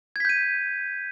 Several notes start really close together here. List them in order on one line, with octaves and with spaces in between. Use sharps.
G#6 B6 G6 D#7